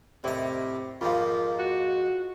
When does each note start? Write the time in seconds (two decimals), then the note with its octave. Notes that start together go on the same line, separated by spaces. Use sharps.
0.24 A2 C3 A#4 D5 D#5
1.01 F2 G#2 F3 A#3 F4 F5
1.59 F#4